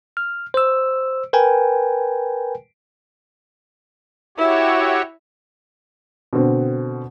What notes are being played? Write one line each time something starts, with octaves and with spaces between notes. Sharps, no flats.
F6
C5 E6
A#4 B4 G5 G#5
E4 F#4 G4 C#5 E5
B2 D3 C4